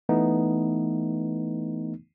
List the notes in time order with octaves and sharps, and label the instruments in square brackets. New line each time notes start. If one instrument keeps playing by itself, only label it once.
[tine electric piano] E3 A3 B3 D#4